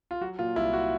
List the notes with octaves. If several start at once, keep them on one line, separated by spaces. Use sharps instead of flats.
F4
F#3 F#4
A#2 F4
C2 E4
F#4